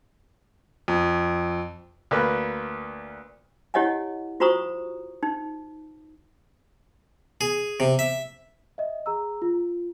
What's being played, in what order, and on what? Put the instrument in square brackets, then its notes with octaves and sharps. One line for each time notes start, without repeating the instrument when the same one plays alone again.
[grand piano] F2
[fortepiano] D2 A#3 B4
[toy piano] E4 G4 C#5 D#5 F#5 G#5
F4 F#4 C5 A#5 C#6 D#6
D#4
[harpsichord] G#4
C3
E5
[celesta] D#5 E5
G#4 A#5 E6
F4